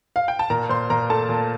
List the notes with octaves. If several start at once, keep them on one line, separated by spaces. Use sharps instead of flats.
F5
G5
A5
A#2 A#4 A#5
A#2 C5 C6
A#2 A#4 A#5
A3 A4 A5
A#2